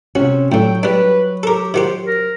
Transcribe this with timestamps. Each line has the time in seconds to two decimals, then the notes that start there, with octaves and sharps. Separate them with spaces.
0.15 C3 C#4 F#4
0.52 A2 D3 F#3 G5
0.83 G3 D4 B4
1.43 G4 A4 A#4
1.74 D#3 F#4 G4 C5
2.04 A#4